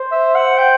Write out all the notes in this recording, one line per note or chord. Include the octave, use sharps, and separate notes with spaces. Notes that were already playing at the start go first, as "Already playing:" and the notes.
Already playing: C5
E5
F#5
G5